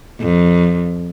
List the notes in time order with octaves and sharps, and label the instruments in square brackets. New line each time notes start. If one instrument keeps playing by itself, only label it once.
[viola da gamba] F2